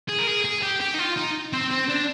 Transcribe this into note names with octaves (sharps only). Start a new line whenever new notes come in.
G#4
A#4
G#4
G#4
G4
G4
D#4
F4
D#4
C4
C4
D4